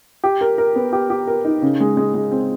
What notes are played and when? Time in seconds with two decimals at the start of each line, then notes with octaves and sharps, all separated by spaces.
0.24 G4
0.41 A#4
0.58 A#4
0.75 B3
0.93 G4
1.10 G4
1.27 A#4
1.45 D#4
1.62 C#3
1.80 G#3
1.97 G#3
2.14 G#3
2.31 C4